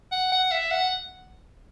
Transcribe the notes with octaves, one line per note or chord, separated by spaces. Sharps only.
F#5
F#5
E5
F#5